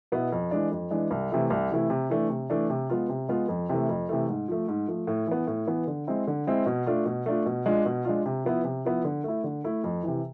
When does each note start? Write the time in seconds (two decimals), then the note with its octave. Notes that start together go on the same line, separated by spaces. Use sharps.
0.12 B2 B3 E4
0.32 F2
0.51 E3 G#3 D4
0.71 F2
0.91 E3 G#3 D4
1.11 C2
1.31 C3 E3 A3 E4
1.50 C2
1.70 C3 E3 A3 E4
1.90 C3
2.10 E3 A3 D4
2.29 C3
2.50 E3 A3 D4
2.70 C3
2.90 G#3 B3 F4
3.09 C3
3.29 G#3 B3 F4
3.48 F2
3.69 C3 E3 A3
3.89 F2
4.09 C3 E3 A3
4.28 G#2
4.48 F3 A3
4.68 G#2
4.87 F3 A3
5.07 A2
5.27 E3 B3
5.47 A2
5.67 E3 B3
5.87 D3
6.07 G#3 C4 E4
6.27 D3
6.47 G#3 C4 E4
6.66 B2
6.86 A3 D4 F4
7.06 B2
7.26 A3 D4 F4
7.46 B2
7.66 G#3 D4 F4
7.85 B2
8.05 G#3 D4 F4
8.26 C3
8.45 F3 B3 E4
8.64 C3
8.85 F3 B3 E4
9.04 D3
9.24 A3 E4
9.44 D3
9.64 A3 E4
9.84 F2
10.03 C3 E3